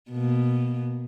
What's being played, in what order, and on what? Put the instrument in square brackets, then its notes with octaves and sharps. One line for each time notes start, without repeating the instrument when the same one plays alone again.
[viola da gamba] B2 A#3